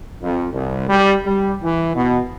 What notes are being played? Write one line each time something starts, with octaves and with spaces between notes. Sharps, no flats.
F2
C2
G3
G3
E3
B2